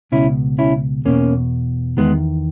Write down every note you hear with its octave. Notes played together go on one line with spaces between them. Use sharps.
C#2 B2 C#4 E4
C#4 E4
E2 B2 A#3 C#4
E2 D#3 G#3 B3